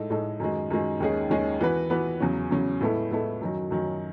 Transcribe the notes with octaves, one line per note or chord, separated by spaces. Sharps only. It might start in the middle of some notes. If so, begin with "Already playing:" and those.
Already playing: A2 G#3 D#4 A4
A2 G#3 D#4 A4
F#2 D#3 G#3
F#2 D#3 G#3
D#2 D#3 G#3 C#4 G#4
D#2 D#3 G#3 C#4 G#4
E3 B3 F#4 B4
E3 B3 F#4 B4
E2 C#3 F#3 C#4
E2 C#3 F#3 C#4
A2 G#3 B3 E4 A4
A2 G#3 B3 E4 A4
F#2 D#3 F#3
F#2 D#3 F#3